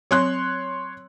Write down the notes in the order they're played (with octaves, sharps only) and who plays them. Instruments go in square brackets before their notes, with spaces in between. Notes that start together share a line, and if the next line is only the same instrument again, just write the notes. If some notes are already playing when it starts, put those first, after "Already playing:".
[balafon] F#3 C4 [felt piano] C#5 C6 F#6